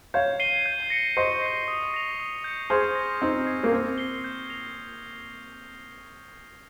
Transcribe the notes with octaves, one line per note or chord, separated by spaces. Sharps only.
C#5 F5 G6
C7 D#7 G7
G6
A#6 C#7
C5 D#5 C#6
G6 C7
D#6
A#6 F7
D#6
G6 C#7
G#4 C5 F6
A#6 C#7
C4 D#4 F6
G#6 C7
A#3
C4 G6
C7 G7
G6
A#6 F7